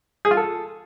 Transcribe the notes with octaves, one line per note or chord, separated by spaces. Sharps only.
G#4
F4
A4